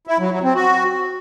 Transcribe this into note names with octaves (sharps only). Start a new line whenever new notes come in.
E4
F#3
F#3
C4
F#4